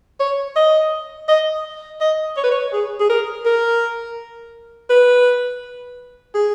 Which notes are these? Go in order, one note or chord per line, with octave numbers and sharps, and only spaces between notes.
C#5
D#5
D#5
D#5
C#5
B4
C#5
G#4
G#4
A#4
A#4
B4
G#4